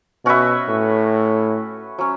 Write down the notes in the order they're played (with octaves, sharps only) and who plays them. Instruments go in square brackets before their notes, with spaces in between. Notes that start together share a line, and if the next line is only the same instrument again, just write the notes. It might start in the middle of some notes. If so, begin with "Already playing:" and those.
[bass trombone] B2 [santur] C#4 F#4 B4 E5
[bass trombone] A2
[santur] F#3 C#4